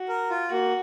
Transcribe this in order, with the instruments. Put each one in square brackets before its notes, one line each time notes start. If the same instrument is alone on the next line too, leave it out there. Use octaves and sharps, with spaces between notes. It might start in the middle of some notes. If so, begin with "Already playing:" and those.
Already playing: [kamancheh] F#4
[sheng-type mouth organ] A#4
F4
[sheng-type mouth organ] A#3 [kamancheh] F#4